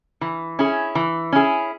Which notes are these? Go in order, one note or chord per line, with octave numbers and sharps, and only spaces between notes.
E3
C#4 E4 G#4
E3
C#4 E4 G#4